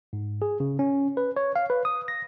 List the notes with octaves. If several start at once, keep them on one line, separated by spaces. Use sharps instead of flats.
G#2
G#4
C#3
C#4
B4
C#5
F5
B4
D#6
A#6